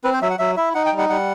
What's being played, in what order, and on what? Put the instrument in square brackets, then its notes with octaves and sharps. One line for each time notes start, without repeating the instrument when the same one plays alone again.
[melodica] C4 B4
C5
F#3 E5
F#5
F#3 E5
E4 E5
D#4 F#5
G5
G3
F#5
G3 F#5